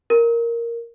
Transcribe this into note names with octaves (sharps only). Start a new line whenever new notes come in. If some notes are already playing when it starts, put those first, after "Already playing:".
A#4